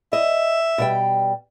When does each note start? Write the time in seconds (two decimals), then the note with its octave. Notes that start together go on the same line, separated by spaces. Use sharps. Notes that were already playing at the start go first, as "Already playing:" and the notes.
0.13 D#5 E5
0.78 B2 G3 G5